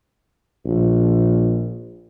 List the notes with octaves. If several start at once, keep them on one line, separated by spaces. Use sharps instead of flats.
A#1